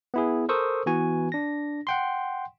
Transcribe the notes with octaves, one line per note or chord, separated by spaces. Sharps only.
B3 E4 G#4
A4 A#4 C5 C#6 D#6 E6
E3 B3 F#4 G#5
D4 A#6
F#5 G5 C6